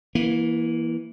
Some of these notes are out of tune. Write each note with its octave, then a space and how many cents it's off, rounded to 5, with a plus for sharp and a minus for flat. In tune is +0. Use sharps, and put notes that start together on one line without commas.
E3 +0 A#3 +30